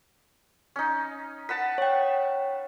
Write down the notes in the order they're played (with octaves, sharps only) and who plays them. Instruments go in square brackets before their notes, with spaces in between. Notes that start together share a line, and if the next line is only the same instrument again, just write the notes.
[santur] C#4 D#4
[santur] B4 F#5 A5 [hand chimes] B6
[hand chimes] C#5 G5